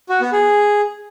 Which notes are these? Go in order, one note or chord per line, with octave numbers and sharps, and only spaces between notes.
F#4
B3
G#4